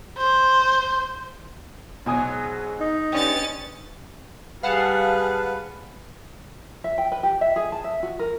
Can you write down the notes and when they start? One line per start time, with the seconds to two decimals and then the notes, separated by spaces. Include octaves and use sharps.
0.18 C5
2.06 G#2 B2 F#3 G#5 D#6
2.80 D#4
3.12 G2 C#4 D5 G5 A6
4.63 G3 G#4 B4 F5 F#5 A5
6.84 E5
6.98 G5
7.12 B4
7.23 G4
7.41 E5
7.56 G#4
7.72 A5
7.84 E5
8.03 F#4
8.19 A#4